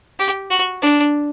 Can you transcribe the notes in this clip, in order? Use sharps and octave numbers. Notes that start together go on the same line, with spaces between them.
G4
F#4
D4